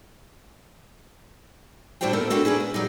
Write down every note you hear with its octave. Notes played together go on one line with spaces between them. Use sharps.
A2 G3 D4 F#4 C5 G5
A#3 B3 E4 A4 A#4
B3 C4 D4 E4 F#4 A4
A#3 D4 G#4 B4
B4
D#3 F#3 G3 D#4